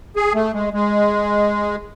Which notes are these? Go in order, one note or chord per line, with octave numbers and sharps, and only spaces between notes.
G#4
A3
G#3
G#3